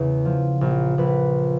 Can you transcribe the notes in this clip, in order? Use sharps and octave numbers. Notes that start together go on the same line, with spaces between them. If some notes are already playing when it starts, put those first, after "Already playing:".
Already playing: E2 C#3
F3
A#1
A#1 B4